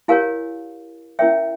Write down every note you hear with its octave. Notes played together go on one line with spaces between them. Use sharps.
E4 G4 A#4 C#5 F5 G#5
C#4 E4 A#4 C#5 E5 G5